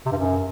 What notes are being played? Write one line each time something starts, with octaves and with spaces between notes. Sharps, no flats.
C3
G2
F#2